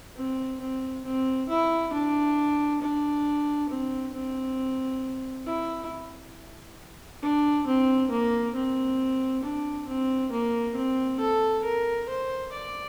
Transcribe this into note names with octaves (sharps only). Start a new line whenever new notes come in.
C4
C4
C4
E4
D4
D4
C4
C4
E4
D4
C4
A#3
C4
D4
C4
A#3
C4
A4
A#4
C5
D5